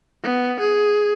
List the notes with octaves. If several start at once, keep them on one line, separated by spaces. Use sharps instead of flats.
B3
G#4